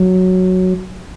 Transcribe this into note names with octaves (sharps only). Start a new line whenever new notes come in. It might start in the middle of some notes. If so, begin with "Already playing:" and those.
Already playing: F#3